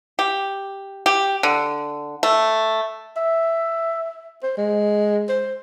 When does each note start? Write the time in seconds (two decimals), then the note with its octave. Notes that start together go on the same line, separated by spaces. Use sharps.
0.19 G4
1.06 G4
1.43 D3
2.23 A3
3.17 E5
4.43 C5
4.58 G#3
5.29 C5